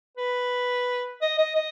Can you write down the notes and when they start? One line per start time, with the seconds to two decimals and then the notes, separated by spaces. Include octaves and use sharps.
0.18 B4
1.22 D#5
1.38 D#5
1.56 D#5